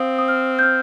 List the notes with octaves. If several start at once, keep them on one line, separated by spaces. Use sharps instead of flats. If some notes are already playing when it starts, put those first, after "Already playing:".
Already playing: C4 F5 D#6
D#6
F6
G6
F6